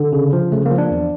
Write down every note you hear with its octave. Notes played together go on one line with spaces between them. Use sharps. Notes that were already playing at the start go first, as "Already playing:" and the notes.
Already playing: D3
C#3
F3
C#3 A3
A#3
F3
D4
E2